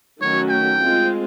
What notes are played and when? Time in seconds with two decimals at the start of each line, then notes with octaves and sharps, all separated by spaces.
0.21 D#3 F#3 A3 C#4 F#4 C#5
0.49 G5
0.78 G#3 C4 F4